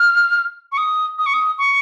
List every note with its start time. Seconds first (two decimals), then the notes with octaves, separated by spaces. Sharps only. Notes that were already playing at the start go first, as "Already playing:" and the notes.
Already playing: F6
0.72 C#6
0.78 D#6
1.18 D#6
1.26 C#6
1.34 D#6
1.58 C#6